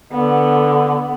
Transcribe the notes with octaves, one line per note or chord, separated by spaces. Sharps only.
D3 B3